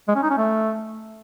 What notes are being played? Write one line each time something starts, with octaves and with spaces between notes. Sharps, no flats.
G#3
C#4
D#4
C#4
A3